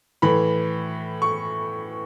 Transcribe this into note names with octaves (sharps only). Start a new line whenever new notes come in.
A2 E3 B5
C#6